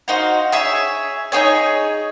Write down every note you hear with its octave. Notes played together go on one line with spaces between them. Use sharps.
D#4 F#4 C5 F5
G#4 C#5 E5
D#4 E4 G#4 C#5